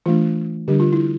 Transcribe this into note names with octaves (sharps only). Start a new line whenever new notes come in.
E3 A3 D4 F4
D3 G3 D4 G4
F4
E4